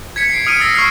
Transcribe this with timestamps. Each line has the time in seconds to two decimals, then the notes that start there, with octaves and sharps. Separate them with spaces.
0.16 G#6 B6 C#7
0.30 C7 D7
0.46 D#6 F6 D7 D#7
0.60 E6 A6 A#6 C7 C#7 D#7
0.75 C#6 F6 C7